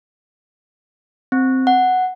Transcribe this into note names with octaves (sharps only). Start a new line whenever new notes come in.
C4
F#5